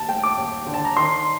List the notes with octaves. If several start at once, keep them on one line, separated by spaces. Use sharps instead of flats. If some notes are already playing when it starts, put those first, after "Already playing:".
Already playing: D#2 A5
A3 G5
D6
D#2
D3
A5
A#5
D#3 C6